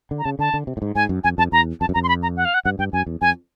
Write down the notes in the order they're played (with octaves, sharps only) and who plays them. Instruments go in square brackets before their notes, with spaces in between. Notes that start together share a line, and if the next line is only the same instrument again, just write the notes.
[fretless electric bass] D3
[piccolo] A#5
[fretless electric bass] C#3 [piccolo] A5
[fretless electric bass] D3 [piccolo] A5
[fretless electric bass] D3
C3
A2
G#2
[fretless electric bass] G#2 [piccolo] G#5
[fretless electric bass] F#2
[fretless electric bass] F2 [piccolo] G#5
[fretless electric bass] F2 [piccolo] A5
[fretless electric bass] E2 [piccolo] A#5
[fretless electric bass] F2 [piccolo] A5
[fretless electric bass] F#2
[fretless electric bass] F2 [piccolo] A#5
[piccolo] C6
B5
A#5
F#5
F5
F#5
[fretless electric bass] G2 [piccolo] F#5
[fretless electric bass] G2 [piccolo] G5
[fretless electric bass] F#2 [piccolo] G#5
[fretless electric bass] E2
[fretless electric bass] F2 [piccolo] G#5